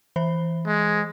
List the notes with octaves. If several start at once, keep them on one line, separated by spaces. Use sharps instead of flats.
E3 C5
G#3